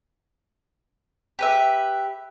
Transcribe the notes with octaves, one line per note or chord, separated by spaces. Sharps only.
G4 B4 E5